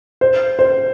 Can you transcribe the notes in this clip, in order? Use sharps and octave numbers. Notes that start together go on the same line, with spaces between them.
C5
C5